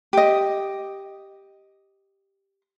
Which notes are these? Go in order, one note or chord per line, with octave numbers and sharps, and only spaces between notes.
G4 D#5